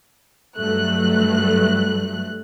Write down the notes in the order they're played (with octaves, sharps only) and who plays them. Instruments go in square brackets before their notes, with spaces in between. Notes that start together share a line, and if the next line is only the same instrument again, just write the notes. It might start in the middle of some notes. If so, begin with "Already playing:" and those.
[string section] G2 F#3 A3 F#6